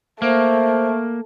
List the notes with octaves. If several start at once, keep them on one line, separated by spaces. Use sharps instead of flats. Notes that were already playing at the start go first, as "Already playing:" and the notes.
A3 A#3 C5